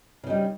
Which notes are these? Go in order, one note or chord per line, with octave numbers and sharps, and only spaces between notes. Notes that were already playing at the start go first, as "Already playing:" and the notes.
C#3 G3 D#4